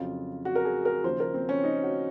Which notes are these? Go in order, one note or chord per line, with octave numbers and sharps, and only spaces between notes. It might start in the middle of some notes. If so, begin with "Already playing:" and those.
Already playing: F2 C#3 F#3 F4
F#4
A#4
G#4
A#4
D#2 C#3 F3 C5
A#4
C4
C#4
D#4
F#4